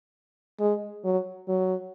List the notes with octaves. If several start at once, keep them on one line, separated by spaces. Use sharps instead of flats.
G#3
F#3
F#3